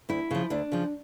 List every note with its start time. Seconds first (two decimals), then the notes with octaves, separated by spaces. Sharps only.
0.09 D2 E4
0.31 C#3 F3
0.50 D2 D4
0.72 C#3 F3